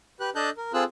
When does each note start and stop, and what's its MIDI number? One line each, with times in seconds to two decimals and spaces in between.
0.20 0.30 67
0.20 0.30 71
0.20 0.30 90
0.35 0.50 62
0.35 0.50 69
0.35 0.50 75
0.35 0.50 81
0.35 0.50 90
0.35 0.50 91
0.58 0.72 70
0.74 0.84 60
0.74 0.84 65
0.74 0.84 68
0.74 0.84 69
0.74 0.84 88
0.74 0.84 90